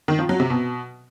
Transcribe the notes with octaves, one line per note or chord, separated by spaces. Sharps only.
D#3
F3
F#3
C3
B2